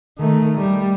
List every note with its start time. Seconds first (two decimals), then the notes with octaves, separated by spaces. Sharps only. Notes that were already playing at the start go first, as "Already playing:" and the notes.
0.18 D#3 A3
0.58 G3